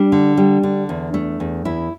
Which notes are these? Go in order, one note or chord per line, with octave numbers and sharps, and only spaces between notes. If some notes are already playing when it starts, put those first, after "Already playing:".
Already playing: G3 D4
D3
G3
D3
E2
A3
E2
E2 E4